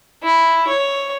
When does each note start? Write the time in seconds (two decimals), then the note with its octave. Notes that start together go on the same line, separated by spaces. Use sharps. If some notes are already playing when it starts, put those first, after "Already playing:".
0.23 E4
0.67 C#5